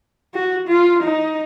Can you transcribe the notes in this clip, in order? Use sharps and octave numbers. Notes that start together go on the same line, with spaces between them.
F#4
F4
D#4